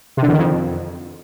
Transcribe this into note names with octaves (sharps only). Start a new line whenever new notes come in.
C3
D3
E2
D#3
F2